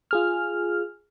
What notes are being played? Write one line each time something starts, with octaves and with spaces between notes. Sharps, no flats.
F4 G#4 F6